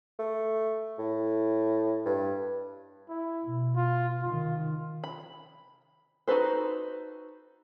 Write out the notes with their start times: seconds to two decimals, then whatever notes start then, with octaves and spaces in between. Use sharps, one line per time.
0.19 A3
0.99 A2
2.06 G2
3.09 E4
3.44 B2
3.76 F4
4.22 C3 D#3 F4
5.04 B5
6.28 D#4 F#4 A4 B4 C5